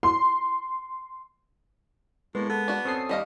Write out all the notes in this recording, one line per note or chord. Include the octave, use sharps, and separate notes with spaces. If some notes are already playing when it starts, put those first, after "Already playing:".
C6
A2 G#3 A#3 B3
B3 A4
D4 F#4
C4 C#4 A4 C#6 D#6 C7
D#2 G3 D#5 F5